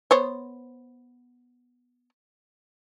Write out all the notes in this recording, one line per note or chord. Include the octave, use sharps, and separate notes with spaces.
B3 C5 C#5